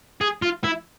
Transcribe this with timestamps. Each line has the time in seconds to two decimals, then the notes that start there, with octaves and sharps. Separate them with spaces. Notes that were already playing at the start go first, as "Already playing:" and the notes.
0.21 G#4
0.42 F4
0.64 E4